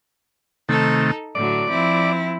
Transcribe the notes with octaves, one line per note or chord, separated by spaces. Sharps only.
C3 D#3 A3 D#4 A4
A2 D3 F#3 D5
F3 C4 E4